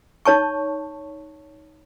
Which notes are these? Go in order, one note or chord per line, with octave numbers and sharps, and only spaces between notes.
D#4 C#5 A5 C#6